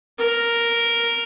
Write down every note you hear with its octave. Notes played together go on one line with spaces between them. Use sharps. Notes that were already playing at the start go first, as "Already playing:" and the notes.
A#4